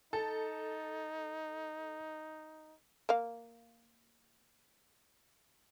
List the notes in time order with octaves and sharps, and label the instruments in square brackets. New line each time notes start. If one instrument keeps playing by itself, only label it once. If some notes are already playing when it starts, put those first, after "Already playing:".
[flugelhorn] D#4 [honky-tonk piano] A4
[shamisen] A#3 F5